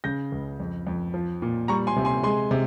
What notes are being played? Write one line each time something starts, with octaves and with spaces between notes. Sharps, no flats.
C#3 G6 A#6
C#2
F2
F2
F3
A#2
G3 A#5 C#6
G#5 C6
C3
G#5 C6
G#3 G#5 C6
C3